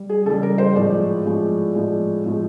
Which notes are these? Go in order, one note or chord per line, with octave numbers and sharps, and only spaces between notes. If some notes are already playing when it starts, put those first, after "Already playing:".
Already playing: G3
G#4
C#3 E3 G3 A4
A#4
C5
A2 F3 G#3 D5
A2 F3 G#3
A2 F3 G#3
A2 F3 G#3